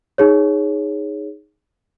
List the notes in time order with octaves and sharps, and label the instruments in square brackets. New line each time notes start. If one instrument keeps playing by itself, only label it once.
[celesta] D#4 G#4 C#5